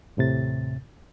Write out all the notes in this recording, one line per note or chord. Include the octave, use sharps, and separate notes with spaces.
D#2 A2 C3 A6